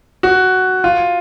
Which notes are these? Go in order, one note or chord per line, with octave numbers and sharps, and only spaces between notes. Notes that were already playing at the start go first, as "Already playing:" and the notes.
F#4
F4